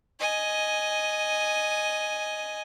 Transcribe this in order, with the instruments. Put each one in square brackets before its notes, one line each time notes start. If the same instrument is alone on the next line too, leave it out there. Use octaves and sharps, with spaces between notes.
[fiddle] D#5 G#5